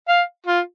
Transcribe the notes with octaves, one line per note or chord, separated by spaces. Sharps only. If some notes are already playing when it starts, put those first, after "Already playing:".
F5
F4